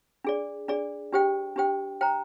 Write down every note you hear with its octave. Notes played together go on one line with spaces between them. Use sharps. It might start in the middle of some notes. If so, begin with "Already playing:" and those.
D4 G#4 D5
D4 G#4 D5
D4 G4 C5 G5
D4 G4 C5 G5
C5 G5 A#5